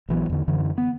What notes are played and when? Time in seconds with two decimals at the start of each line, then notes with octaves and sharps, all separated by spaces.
0.09 A#1 E3 F#3 B3
0.29 E2 D3
0.48 F#2 D3 E3
0.78 B3